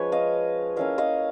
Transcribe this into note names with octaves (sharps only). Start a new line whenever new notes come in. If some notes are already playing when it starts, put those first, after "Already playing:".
Already playing: F3 G#3 C#4 B4 C#5
D#5 F5
A#3 C#4 E4 D#5 F5
D#5 F5